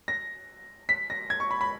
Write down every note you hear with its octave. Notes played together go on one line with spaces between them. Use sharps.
A#6
B6
A#6
G#6
C#6
B5
B5